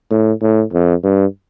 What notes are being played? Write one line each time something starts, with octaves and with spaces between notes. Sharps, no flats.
A2
A2
F2
G2